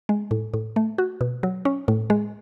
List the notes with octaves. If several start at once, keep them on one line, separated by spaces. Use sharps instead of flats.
G#3
A2
A2
A3
F#4
B2
F#3
C#4
A2
G#3